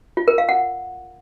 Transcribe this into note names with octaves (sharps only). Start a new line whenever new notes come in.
F4
A#4
F5
F#5